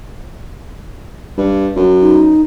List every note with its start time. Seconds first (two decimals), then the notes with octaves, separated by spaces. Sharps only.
1.38 G2
1.76 F#2
2.01 D#4